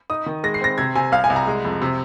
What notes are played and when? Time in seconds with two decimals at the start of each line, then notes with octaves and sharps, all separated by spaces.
0.10 D#4 D#6
0.26 D#3
0.43 G#3 A#6
0.54 C7
0.61 C4 A#6
0.78 C3 G#6
0.95 C3 G#5
1.12 C2 F5
1.24 G#5
1.30 C2
1.36 A#5
1.47 G#3
1.65 F2
1.82 C3